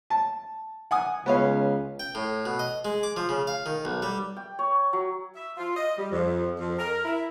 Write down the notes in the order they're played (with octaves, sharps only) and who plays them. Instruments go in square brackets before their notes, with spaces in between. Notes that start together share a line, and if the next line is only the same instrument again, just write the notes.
[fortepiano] A5
F#5 G#5 D#6
[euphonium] C#2 [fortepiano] B3 C#4 F5
[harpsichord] G5
A2
B2
D#5
G#3
D6
F3
C#3
F5
D#3
B1
G3
[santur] G5
C#5
F#3
[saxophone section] E5
F4
D#5
G3
F2
F2
A#4
E4